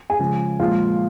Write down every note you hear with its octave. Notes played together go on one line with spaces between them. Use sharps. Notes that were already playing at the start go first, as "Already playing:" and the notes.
G#4 G#5
C#3 F3 G#3
A#2 F3 G#3 F4 F5